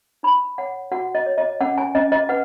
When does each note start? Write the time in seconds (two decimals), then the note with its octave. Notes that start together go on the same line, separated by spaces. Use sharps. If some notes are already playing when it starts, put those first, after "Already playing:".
0.23 D#4 B5
0.58 C#5 F#5
0.92 F#4 F#5
1.15 D#5
1.26 C#5
1.38 D#5
1.61 C#4 F#5
1.78 G#5
1.95 C#4 D#5
2.12 D#5
2.29 B4 F#5